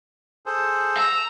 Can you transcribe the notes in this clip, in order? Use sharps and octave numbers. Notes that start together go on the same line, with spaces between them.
G#4 A4 C5
A#5 E6